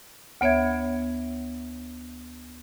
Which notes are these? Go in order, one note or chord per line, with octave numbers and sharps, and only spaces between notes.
D2 B3 C#5 E5 G#6